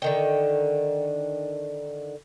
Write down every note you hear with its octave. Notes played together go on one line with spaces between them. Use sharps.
D3 D#3 G5